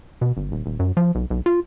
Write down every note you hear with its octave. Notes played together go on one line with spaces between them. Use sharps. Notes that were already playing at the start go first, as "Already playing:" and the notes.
B2
G1
D#1
D#1
F#2
F3
B1
B1
F4